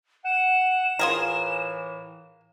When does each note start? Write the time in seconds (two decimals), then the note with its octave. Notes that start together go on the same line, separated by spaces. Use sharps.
0.25 F#5 E7
0.99 A2 E3 F4 G#4 A#4